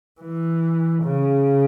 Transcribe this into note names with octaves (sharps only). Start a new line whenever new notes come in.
E3
C#3